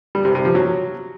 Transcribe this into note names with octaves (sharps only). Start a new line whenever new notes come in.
G3
C3
C3
F3
F#3